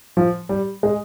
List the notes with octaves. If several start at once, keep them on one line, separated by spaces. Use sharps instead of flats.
F3
G3
G#3